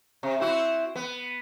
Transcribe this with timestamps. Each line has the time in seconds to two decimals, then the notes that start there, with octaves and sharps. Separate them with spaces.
0.23 C3
0.40 C4 E4 F#4
0.96 B3